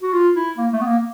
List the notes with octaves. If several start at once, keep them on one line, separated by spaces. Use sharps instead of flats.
F#4
F4
E4
A#3
A3
B3
A#3